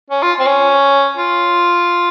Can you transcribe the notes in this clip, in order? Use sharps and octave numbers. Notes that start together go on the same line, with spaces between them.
C#4
F4
C4
C#4
F4